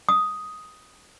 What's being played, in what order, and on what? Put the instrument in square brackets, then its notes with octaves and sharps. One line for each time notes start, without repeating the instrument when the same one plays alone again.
[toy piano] D#6